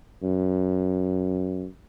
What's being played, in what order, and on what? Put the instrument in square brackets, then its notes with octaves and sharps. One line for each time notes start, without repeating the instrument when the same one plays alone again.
[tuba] F#2